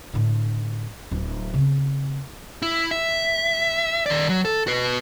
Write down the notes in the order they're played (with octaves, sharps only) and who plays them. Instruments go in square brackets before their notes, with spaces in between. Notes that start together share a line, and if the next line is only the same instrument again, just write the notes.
[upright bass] A2 D3
D1
C#3 C4
[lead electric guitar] E4
E5
D#3 D5
F#3
A4
F#4 B4